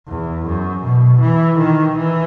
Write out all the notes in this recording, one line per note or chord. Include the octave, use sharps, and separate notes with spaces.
E2
F#2
B2
E3
D#3
E3